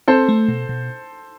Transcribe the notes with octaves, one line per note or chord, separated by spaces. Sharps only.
C4 A4 C5
A3
B2
B2